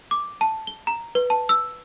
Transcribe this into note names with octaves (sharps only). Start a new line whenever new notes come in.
D6
A5
G7
A#5
B4
A5
E6